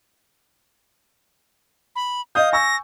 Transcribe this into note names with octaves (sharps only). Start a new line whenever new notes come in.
B5
D#5 F5 D#6 G6
G#5 C#6 E6 A#6